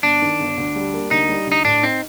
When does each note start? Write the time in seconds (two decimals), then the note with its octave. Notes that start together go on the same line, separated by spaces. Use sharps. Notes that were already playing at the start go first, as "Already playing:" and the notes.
0.03 G1 D4
0.22 D#3
0.39 G1
0.57 D2
0.76 G3
0.94 A#3
1.11 D2 D#4
1.29 G3
1.46 D2
1.52 D#4
1.64 A2 D4
1.83 C4 D#4